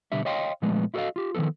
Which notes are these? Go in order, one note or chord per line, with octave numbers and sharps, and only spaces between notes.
B2 D3 G3 E5
C#5 D#5 F5 G5 C6
A#2 F3 G#3 A3 B3
E4 F#4 A4 B4 D#5 F5
F4 G4
D#3 F3 A#3 B3 A4